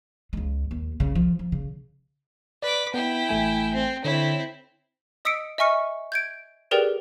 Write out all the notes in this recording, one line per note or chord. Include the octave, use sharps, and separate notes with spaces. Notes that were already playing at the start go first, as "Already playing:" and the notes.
C#2 G#3
D#2
C2 C#3
F3
F3
C#3
B4 D5 D6
B3 E4 G5
A1 A3 G#5
C4
D3 C4 E4 C#5
D#5 D#6 E6 B6 C#7 D7
D#5 E5 G#5 C#6 F6 C#7
G6 G#6 D7
G4 G#4 A#4 B4 D5 G5